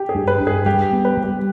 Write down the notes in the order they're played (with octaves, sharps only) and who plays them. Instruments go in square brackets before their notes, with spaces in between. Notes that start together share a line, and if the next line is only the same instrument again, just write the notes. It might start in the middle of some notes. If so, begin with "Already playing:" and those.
Already playing: [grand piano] G4
G#4
[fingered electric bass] G2
[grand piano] B4
[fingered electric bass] G2
[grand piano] G#4
[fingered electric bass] G3 [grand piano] G4
[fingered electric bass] B3
[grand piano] B4
[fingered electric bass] G3
[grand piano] G4